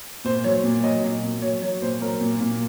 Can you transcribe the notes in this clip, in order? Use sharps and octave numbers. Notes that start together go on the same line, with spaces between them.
A#2 C5
F#3 C#5
A#2
F#3 D#5
A#2
A#2
F#3 C#5
F#3 C#5
A#2 C5
F#3 A#4
A#2
A#2